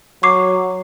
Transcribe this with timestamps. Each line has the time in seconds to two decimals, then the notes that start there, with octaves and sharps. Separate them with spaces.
0.23 F#3 C#6 D6 C7